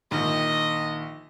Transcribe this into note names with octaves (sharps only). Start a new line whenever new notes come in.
A#1 D#3 D#5